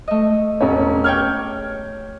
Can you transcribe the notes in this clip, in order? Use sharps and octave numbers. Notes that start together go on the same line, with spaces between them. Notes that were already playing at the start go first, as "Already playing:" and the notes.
A3 D#5
E1 C#4 C#5
G4 C#5 G5 F6 G#6